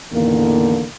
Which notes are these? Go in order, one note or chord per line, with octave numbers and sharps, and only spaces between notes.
A1 E2 D3 D#3 A#3